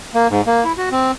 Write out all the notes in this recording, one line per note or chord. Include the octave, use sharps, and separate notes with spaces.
A#3
G#2
A#3
E4
F#4
C4